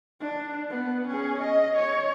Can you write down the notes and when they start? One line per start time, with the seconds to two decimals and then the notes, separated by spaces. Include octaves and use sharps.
0.20 D4
0.70 B3
1.07 C#4 G#4
1.41 D#5
1.76 C#5